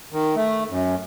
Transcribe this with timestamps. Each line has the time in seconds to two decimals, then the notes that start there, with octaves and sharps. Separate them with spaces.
0.12 D#3
0.36 A3
0.70 F#2